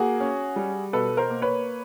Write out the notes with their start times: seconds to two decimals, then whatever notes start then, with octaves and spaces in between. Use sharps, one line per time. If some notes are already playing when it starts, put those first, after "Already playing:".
Already playing: A#3 F#4 G#4
0.20 C#4
0.56 G3
0.93 B2 A4 B4
1.17 A#4 C5
1.30 A#3
1.42 B4 C#5